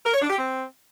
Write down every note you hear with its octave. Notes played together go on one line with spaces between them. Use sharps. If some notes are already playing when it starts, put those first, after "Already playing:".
A#4
C#5
D4
G4
C4